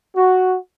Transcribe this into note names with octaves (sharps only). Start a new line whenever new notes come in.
F#4